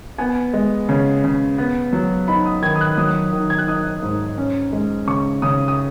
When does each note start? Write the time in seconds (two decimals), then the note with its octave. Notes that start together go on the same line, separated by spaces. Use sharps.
0.18 B3 G#5
0.54 G#3
0.89 C#3
1.24 C#3
1.58 B3
1.93 F#3
2.28 D#4 B5
2.46 D#6
2.62 D#3 G#6
2.76 D#6
2.81 F#6
2.97 F#3 D#6
3.32 D#3
3.50 G#6
3.58 F#6
3.68 D#4 D#6
4.02 G#2
4.38 C#4
4.73 G#3
5.07 C#3 C#6
5.42 C#3 D#6
5.68 D#6